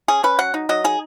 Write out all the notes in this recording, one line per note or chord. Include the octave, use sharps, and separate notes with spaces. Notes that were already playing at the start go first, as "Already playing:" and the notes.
C#4 G#4
C#4 B4
F#3 F#5
D#4
F#3 D#5
D#4 G#4